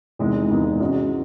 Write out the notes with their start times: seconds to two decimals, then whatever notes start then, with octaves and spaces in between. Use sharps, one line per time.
0.19 E2 C3 D#3 G#3 D#4
0.50 E2 C3 D#3 G#3 D#4
0.80 G#2 E3 G#3 C#4 F#4